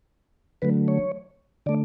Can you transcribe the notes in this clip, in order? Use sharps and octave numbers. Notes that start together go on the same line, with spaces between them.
D3 F#3 A3 B4
C#5
D3 A3 D5